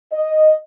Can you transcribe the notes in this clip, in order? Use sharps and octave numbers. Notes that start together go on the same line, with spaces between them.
D#5